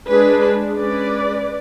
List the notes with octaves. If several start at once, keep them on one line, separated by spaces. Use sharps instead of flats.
G#3 D4 G#4 B4
G#3 C#4 B4 D5